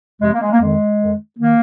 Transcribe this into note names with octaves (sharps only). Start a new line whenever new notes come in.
F2 C3 F3 G#3
A#3
G#3
A#3
F2 D#3 G#3
F2 D#3
D#3 A#3